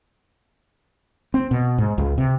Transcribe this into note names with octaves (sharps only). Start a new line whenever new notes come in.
C4
B2
G#2
C#2
C3